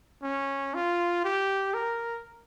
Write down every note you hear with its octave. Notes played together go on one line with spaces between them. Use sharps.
C#4
F4
G4
A#4